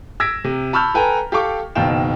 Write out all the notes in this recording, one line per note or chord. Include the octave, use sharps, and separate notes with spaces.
E6 G#6 A#6 B6 D7 E7
C3
A5 B5 C#6 E6 F6 G6
A4 B4 G5 G#5 A#5
G4 A4 F5 G5 C#6 D6
F#1 B2 D#3 F5 G5 E7